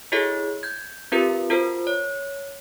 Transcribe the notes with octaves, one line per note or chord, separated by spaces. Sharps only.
E4 F#4 G#4 A4 C#5 D#5
G6 G#6
C4 F4 G4 A#4 B4
F4 F#4 A#4 C5
C#5